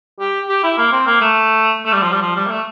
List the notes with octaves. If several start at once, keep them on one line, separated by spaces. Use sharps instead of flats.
G4
G4
E4
A#3
C4
A#3
A3
A3
G3
F3
G3
F3
G3
A#3
A3